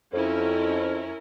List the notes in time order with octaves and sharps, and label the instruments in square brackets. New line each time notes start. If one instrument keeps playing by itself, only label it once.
[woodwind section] F2 [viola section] C#4 E4 A#4